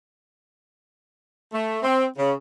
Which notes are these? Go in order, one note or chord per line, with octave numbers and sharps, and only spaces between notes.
A3
C4
C#3